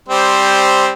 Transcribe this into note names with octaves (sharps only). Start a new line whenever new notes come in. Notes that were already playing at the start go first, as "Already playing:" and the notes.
G3 C4 C5